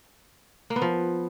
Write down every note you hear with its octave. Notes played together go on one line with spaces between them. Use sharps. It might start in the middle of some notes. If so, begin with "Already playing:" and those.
A#3
B3
F3